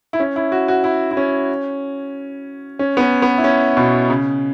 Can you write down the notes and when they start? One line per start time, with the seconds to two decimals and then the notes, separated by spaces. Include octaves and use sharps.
0.13 E4
0.20 C#4
0.36 E4
0.52 F#4
0.68 F#4
0.84 E4
1.11 E4
1.17 C#4
2.79 C#4
2.97 B3
3.00 C#4
3.22 B3
3.38 E4
3.44 C#4
3.77 B2
4.10 C#3